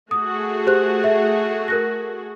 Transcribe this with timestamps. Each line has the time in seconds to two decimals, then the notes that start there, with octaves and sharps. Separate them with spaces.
0.11 A3 F#4 G#4 D#6
0.66 G4 C5 F#6
1.04 E5
1.68 A#4 F#6 A#6